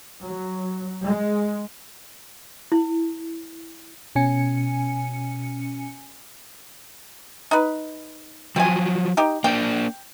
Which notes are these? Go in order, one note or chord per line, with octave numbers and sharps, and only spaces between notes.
F#3
G#3
E4
B2 C#4 G#5 C#7
D#4 B4
F3 F#3 C4 G#5
D#4 G4
A#3 D4 G5